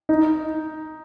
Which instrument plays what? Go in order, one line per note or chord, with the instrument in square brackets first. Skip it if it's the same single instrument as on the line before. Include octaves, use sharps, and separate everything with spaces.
[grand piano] D#4